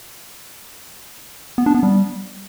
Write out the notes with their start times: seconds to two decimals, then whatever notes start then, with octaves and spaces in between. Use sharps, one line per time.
1.58 B3
1.66 D4
1.75 B3
1.83 G3